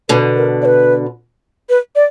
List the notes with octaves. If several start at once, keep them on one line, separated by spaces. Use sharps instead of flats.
B2 D3 B4
A#4
D5
B4
B4
D5